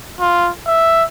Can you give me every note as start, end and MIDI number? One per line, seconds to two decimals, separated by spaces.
0.20 0.50 65
0.67 1.03 76